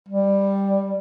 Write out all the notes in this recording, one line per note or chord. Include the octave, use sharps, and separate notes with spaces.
G3